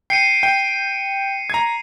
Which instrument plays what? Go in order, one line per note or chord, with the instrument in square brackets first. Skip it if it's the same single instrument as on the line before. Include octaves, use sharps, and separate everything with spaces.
[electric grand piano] G5 [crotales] C7 C#7 D#7
[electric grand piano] G5
A#5 G#6